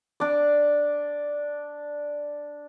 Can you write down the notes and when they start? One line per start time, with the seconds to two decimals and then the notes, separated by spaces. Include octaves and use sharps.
0.20 D4 D5